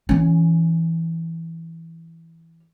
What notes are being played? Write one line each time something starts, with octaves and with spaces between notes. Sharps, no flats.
E3 C#4